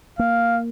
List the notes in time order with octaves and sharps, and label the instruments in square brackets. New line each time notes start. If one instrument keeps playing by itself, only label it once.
[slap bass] A#3 [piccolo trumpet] F5